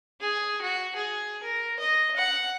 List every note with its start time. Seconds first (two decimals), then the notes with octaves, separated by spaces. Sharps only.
0.21 G#4
0.62 F#4
0.95 G#4
1.43 A#4
1.79 D#5
2.16 F#5